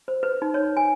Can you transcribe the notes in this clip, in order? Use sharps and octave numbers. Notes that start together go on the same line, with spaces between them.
C5
B4
D#4
C#5
G#5